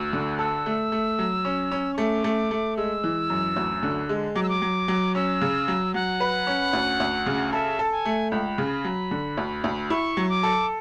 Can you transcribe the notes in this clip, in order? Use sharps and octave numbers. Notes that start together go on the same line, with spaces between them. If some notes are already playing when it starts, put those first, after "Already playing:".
Already playing: D2 E6
D3
A4 E6
A3
A3
F#3
C#4
C#4
C#6
A3 D6
A3
A3
G#3 E6
E3
F#2
D2
D3
G#3
F#3 D6
E6
D6
F#3
F#3
C#4 E6
C#3
F#3
F#3 F#5
B4
C#4
D2
D2
C#3
A4 E5
A4 A5
G#5
A3
C#2 B5
C#3
F#3
D3
D2
D2
E4 C#6
F#3
D6
A4